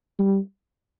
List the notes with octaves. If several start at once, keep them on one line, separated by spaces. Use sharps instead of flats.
G3